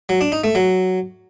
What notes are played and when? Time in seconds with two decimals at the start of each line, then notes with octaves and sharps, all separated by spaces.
0.09 F#3
0.21 D4
0.32 D#4
0.44 A3
0.55 F#3